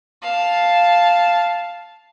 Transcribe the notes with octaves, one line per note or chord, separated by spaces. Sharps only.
F5 A5